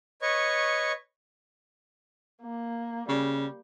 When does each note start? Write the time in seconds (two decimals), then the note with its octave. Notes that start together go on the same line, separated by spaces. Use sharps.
0.22 B4 C#5 D#5 C#6
2.41 A#3
3.08 C#3 G3